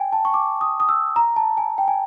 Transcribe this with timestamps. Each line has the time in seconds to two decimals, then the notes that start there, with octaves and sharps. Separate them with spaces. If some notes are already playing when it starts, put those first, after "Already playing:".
Already playing: G5 G#5
0.12 A5
0.25 C#6
0.34 D6
0.61 D#6
0.80 D#6
0.89 E6
1.16 A#5
1.36 A5
1.57 G#5
1.78 G5
1.88 G#5